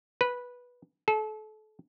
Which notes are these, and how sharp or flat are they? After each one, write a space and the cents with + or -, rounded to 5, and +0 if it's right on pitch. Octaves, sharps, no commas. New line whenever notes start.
B4 -10
A4 -35